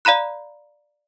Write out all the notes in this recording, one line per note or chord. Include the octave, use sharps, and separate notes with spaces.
D5 F5 A#5 B5 F#6